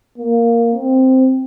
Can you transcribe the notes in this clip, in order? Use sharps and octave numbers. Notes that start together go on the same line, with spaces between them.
A#3
C4